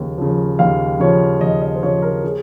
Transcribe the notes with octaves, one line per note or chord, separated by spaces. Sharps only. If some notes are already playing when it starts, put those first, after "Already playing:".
Already playing: D#2 C#3 F3
C#3 F3
D#2 F5
C#3 F3 C#5
D#2 D#5
D#5
C5
C#3 F3 C#5
A#4
G#4